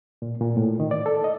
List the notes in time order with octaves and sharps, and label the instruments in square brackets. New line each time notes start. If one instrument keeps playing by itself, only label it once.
[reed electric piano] A#2
A#2
A2
D#3
D5
A4
D#5